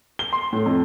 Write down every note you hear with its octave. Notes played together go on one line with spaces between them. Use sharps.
G7
C6
A2
F2